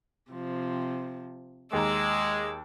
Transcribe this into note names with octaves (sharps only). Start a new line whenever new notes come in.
C3 F3
D#2 G#3 A#5 D6 E6